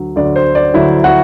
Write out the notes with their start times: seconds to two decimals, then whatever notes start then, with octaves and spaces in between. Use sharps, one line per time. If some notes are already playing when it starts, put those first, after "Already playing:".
Already playing: D2 D3 F#3
0.16 D2 D3 F#3 D5
0.36 C5
0.55 D5
0.74 D2 D3 F#3 E4 E5
1.04 F#4 F#5